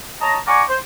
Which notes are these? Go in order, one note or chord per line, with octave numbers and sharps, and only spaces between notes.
C#5 D#5 A5 A#5
D5 F#5 G#5 A#5 C#6 D6
C5